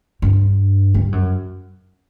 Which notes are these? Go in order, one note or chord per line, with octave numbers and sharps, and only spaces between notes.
G2
G2
F#2